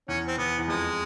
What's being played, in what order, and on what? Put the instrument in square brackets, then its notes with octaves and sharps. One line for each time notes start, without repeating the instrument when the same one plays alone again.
[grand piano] E2 [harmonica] C#4
[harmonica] C4
[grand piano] E2 [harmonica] B3
[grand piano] E2
[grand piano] F2 [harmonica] G#3